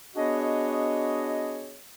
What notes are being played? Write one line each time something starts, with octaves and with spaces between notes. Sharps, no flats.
B3 D4 F#4 G#4 C#5 D#5